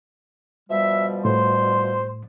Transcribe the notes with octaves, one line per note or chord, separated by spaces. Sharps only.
B2 F3 G3 E5
A2 C5 C6